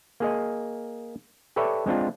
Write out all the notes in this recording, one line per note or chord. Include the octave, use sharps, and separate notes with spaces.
A#3 G#4 D#5
G4 A4 B4 C#5 D5 E5
G#3 C4 D4 F4